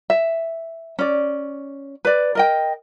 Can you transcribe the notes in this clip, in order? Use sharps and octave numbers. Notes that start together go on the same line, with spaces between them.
E5
C#4 D5
B4 D5
A#4 D#5 G5